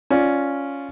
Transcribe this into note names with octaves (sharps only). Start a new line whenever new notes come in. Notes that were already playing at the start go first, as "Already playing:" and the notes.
C#4 F4 D5